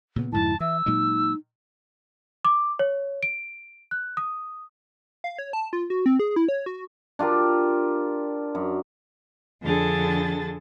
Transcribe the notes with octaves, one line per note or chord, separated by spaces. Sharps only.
A#2 C#3 B3
F2 G#2 D3 E4 A5
E3 E5 E6
A#2 F#3 G#3 D#4
D6
C#5
D7
F#6
D#6
F5
C#5
A5
F4
F#4
C4
G#4
E4
C#5
F#4
D4 F4 G4 A#4
F#2
F2 D3 D4 G#4 A4 A6